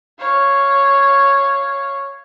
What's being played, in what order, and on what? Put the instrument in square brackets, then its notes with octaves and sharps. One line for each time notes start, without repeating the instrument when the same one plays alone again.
[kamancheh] C#5 F5